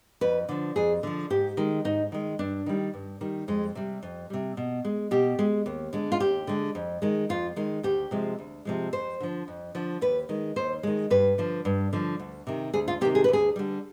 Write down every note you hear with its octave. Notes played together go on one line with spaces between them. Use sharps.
F2 B4
D3 F3
F2 G#4
D3 F3
G#2 G4
D#3 G#3
G#2 D#4
D#3 G#3
G2 D4
D#3 G3
G2
D#3 G3
F2 G#3
C3 G3
F2
C3 G3
B2
G#3
B2 G4
G#3
D#2
D3 G#3
F4
D#2 G4
D3 G#3
F2
D#3 G#3
F2 F4
D#3 G#3
D2 G4
C3 F3 G#3
D2
C3 F3 G#3
F2 C5
D3 F3
F2
D3 F3
D#2 B4
D#3 G#3
D#2 C5
D#3 G#3
G2 B4
D3 F3
G2
D3 F3
D2
C3 D#3
D2 G#4
F4
C3 D#3 G4
G#4
B4
D2 G#4
D3 G3